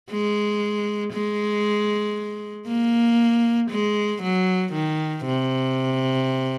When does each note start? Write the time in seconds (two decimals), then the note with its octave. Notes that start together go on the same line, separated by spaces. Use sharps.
0.11 G#3
1.13 G#3
2.68 A#3
3.71 G#3
4.22 F#3
4.73 D#3
5.25 C3